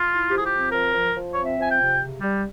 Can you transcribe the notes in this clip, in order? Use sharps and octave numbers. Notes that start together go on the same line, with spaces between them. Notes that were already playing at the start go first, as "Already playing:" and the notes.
Already playing: F4
E4
F3 G4
G#4
G4
C4
F3 A#4
F3
F3
C4 C#5
E5
F3 G#5
G5
C3
C#3
G3